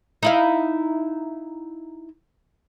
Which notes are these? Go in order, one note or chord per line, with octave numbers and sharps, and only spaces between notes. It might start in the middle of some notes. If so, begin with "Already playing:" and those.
D#4 E4 F5